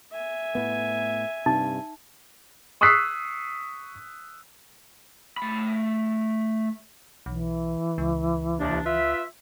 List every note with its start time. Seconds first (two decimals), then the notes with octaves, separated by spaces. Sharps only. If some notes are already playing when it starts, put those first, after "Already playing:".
0.12 E5 G#5
0.55 A2 B3
1.46 G2 C3 D#4
2.81 C#6 D#6 E6 F#6 B6 C7
5.37 A3 B5
7.26 B1 E3
7.98 C#2
8.58 D#2 C3 D4
8.85 F4 B4 E5